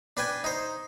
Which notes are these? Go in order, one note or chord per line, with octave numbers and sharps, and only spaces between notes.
D4 B4 G5 G#5
D#4 C5